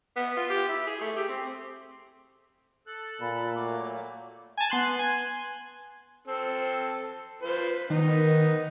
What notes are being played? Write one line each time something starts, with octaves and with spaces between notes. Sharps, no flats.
B3
F4
G4
E4
G#4
A3
G4
C4
A4 F#6
A#2 B5
F#3 A3 A#3 D6
G#5 A5
B3 C6 F#6
G#5
C4 A4
F4 B4 C5
D#3 B3 D#4